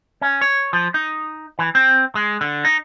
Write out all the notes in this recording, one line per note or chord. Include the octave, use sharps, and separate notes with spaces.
C#4
C#5
F3
D#4
E3
C4
G#3
D3
D#4